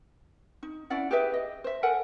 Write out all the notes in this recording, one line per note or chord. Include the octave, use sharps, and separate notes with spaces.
D#4
C#4 E4 D5 F#5
G4 G#4 B4 E5
D#5
C5 E5
A4 A#4 F#5 G#5